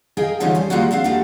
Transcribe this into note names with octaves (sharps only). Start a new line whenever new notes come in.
G#4 A#4 D#5 F5 G5 G#5
D3 E3 F3 G3 C#4 D#4
G3 C5 G#5
F3 G3 G#3 A#3 E4 F#4
C4 D4 F5 F#5
F3 A3 A#3 D4 F#4 G4